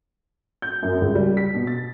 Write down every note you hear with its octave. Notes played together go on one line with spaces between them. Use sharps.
G6
F#2
C#2
G3
B6
B2
A6